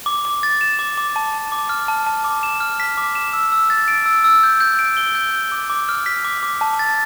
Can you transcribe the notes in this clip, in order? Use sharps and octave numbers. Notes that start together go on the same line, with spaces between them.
D6
D6
A6
E7
D6
D6
A5
A5
D6
F6
A5
A5
D6
E7
F6
B6
D6
E7
E6
E6
A6
D7
E6
E6
G6
G6
D7
G7
G6
G6
D6
D6
F6
B6
D6
D6
A5
A6